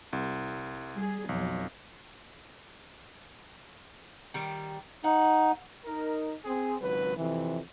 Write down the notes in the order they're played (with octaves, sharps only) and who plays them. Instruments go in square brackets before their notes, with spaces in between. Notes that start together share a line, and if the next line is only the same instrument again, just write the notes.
[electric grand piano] C2
[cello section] G3 G#4
[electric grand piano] B1 [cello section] F2 F#3
[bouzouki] D#3 G3
[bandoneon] D#4 [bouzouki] F#5
[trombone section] D#4 A#4
C4 G#4
G#1 C#2 F#3 B4
F2 C3 E3